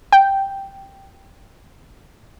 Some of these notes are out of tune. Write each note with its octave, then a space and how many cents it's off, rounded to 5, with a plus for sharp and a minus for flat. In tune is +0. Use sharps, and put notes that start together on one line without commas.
G5 +0